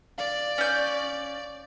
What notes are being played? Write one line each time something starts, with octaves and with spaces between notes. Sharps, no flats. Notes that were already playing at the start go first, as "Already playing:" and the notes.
D5 F5
C#4 G6